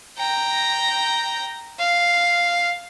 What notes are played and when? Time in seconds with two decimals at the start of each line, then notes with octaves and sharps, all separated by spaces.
0.18 G5 A#5
1.79 F5